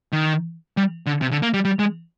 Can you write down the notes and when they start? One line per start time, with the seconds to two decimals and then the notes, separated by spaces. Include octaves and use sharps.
0.12 D#3
0.77 G3
1.06 D3
1.21 C3
1.31 D3
1.42 A#3
1.54 G3
1.65 G3
1.79 G#3